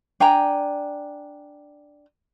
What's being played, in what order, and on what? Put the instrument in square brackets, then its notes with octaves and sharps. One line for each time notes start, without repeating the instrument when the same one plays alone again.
[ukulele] D4 G5 G#5 A#5